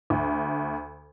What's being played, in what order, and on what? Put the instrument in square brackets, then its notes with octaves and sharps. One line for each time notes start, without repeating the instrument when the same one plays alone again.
[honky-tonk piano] D2